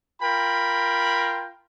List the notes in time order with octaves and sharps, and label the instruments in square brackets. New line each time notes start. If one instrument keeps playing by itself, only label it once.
[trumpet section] F4 A#4 G5 B5